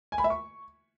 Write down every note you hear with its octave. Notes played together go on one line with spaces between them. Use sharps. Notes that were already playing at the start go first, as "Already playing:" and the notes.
G#5
B5
E5
C#6